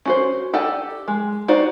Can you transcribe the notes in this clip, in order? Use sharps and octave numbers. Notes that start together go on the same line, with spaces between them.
C#4 F#4 C5
G4 A4 D5 F#5 G#5
G#3
D#4 F#4 C5 D5 G5